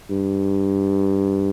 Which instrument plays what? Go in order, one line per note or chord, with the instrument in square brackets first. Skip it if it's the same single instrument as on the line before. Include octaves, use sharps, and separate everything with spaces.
[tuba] G2